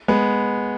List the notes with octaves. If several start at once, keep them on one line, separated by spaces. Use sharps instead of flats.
G#3 B3